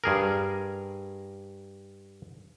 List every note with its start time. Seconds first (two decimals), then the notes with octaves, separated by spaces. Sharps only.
0.04 G2 G#4 A#4